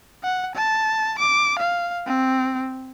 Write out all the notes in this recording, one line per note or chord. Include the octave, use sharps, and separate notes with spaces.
F#5
A5
D6
F5
C4